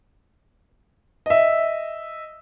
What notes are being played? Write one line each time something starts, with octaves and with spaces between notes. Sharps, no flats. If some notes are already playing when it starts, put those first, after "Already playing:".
D#5 E5